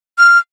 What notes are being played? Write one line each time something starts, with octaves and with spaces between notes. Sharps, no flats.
F6